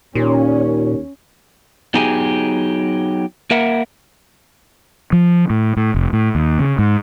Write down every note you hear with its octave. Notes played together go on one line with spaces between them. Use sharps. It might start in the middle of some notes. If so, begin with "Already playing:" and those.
D#2 A#2 C#4
F#3 B3 D#4 G4 G#4 G#5
A#3 A#4 E5 F#5
F3
A2
A2
F1
A2
D#2
C#3
G#2